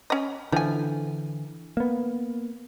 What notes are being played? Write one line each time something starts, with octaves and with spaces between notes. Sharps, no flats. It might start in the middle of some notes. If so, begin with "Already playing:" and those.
C#4 D#5
D3 E3 F3 G#5
A#3 B3